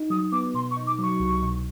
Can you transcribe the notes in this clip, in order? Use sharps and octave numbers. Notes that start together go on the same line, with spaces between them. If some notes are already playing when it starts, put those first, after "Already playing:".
Already playing: D#4
F#3 D#6
B3 D6
B2 C6
C#6
D#4
D6
F#3 C#6
C2
B2